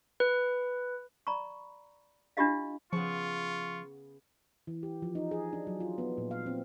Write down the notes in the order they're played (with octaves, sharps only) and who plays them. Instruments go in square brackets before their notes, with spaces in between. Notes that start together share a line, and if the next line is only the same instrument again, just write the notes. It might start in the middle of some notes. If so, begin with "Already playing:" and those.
[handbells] B4
[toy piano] D5 A#5 B5 C#6
D4 E4 F4 G4 D#5 F5
[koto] C#3 B3 [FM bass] F3 [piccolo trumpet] F4 [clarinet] C#6
[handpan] E3
G4
F3
D#4
G#4
D4
F#3
F4
B3
A#2
F5
C4